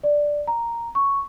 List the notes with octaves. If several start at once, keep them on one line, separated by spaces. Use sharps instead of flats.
D5
A#5
C#6